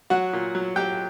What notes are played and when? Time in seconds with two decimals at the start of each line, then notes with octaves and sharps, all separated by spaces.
0.10 F#3 F#4 F#5
0.33 A#2
0.55 F#3
0.76 F#3 G4 G5